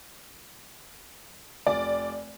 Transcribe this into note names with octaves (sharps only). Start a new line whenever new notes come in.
F1 D5